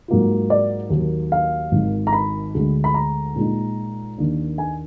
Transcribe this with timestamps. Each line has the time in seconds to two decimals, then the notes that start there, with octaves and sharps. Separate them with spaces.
0.08 G#2 F#3 A#3 F4
0.50 D5
0.90 D#2 D#3 F#3 A#3
1.32 F5
1.72 G#1 G#2 D#3
2.07 A#5
2.13 B5
2.55 D2 D3 G#3
2.84 B5
2.94 A#5
3.36 A#2 G#3 D#4
4.18 D#2 D#3 A#3 D4
4.58 G#5